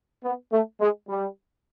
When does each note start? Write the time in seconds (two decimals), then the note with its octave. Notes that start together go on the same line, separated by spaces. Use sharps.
0.24 B3
0.52 A3
0.80 G#3
1.09 G3